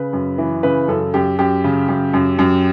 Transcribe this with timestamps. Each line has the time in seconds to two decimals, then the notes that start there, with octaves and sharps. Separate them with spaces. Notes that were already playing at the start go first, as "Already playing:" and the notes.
Already playing: C#3 B4
0.13 F#2
0.38 E3
0.63 C#3 B4
0.88 F#2 A4
1.14 F#2 G4
1.39 F#2 G4
1.64 C#3
1.88 F#2
2.14 F#2
2.39 F#2